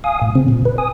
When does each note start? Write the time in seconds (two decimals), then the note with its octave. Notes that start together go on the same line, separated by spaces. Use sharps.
0.04 F5 G#5 D#6
0.22 A2
0.35 C#3 C4
0.48 A#2
0.65 B4
0.78 G#5 D#6